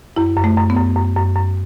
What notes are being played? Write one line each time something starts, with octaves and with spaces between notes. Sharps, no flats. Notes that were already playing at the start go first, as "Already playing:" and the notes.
F#2 E4
F#2
A3
F#2
B3
F#2
F#2
F#2
F#2